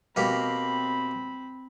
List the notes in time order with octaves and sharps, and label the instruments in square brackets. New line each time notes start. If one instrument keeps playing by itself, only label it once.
[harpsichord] B2 A#3 G4 [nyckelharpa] C4 B5